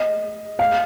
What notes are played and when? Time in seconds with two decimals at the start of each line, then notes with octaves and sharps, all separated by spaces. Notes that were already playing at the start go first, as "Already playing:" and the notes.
Already playing: D#5
0.59 F5